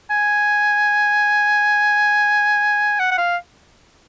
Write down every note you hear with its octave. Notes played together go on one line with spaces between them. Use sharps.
G#5
F#5
F#5
F5